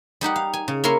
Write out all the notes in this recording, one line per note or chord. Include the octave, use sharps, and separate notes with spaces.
G3 D#4 G4 F#5
F5
G#5
C#3
A#3 E4 A#4 C#5 C6